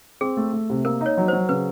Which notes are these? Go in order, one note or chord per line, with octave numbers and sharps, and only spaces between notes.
C4 G#4
A3
A3
C3
A#3 A#4
D#4 C#5
F#3
F#3 C5
C#3 B4